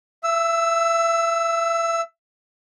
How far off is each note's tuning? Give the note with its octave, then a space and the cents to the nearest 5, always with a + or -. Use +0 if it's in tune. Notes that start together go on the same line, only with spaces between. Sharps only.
E5 +30 E6 +0